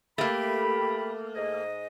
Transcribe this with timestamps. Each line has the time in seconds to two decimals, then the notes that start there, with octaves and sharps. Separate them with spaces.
0.18 A3 A#3 G4 B5
1.35 G#2 D#5